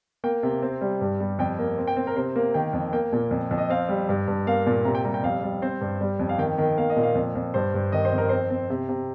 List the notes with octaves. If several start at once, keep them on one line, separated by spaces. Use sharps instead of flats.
A#3 G5
C3
C4
G3
G2
G3
F2 G5
A#3
C4
G5
C4
A#4
C3 C5
A#3
D#3 G5
F2
A#3 G5
A#2
F2
F2
D#5
C4 F5
G3
G2
G2
A#3 F5
A#2
C3 A#5
G5
G3 A#5
G5
F2 F5
G3
C4 C5
G2
G3
F2
F5
D#3 G5
D#3
A#3 F5
D#5
A#2
F5
F2
F2
G2 C5
G2
D#3 D#5
C5
F2
A#4
C4 C5
C4
C3
C3